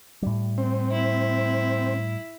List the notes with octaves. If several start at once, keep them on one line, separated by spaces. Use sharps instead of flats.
A2 G3
C4
E4